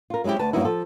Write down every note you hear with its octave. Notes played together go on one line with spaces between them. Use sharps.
F4 A#4
F#3 G#3 C4 E4 G4
D2 B4 A5
G2 F#3 A#3 B3 D#4 E4
F3 A4